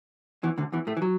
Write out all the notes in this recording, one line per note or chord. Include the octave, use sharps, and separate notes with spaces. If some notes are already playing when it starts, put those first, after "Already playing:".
E2 E3
D2 D3
E2 E3
A2 A3
E3
F#3